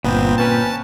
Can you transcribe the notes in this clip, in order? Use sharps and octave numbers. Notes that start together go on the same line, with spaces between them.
G1 A#2 B3 C4
C#4 B4 A5